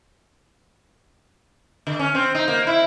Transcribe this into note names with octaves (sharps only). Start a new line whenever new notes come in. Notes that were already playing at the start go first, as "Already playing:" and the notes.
D3
C#4
C4
D#4
A#3
E4